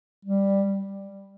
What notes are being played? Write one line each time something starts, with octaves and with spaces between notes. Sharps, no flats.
G3